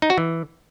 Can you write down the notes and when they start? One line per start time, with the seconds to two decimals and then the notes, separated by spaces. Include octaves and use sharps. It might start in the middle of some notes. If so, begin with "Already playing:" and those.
0.02 D#4
0.10 F#4
0.18 E3